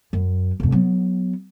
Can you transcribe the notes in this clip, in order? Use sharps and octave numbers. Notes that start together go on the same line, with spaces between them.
F#2
F1 F2
F#3 B3